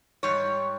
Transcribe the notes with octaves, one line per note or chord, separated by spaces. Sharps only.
G#2 G3 C#5